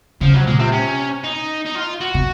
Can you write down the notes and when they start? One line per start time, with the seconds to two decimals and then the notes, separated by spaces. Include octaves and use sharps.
0.21 C#3 F3
0.34 C3 F#3
0.46 A#2 G#3
0.59 C3 C4
0.72 C#4
1.24 D#4
1.65 D#4
1.75 F4
2.01 F#4
2.14 C3